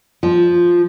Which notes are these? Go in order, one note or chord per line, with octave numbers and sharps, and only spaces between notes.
F3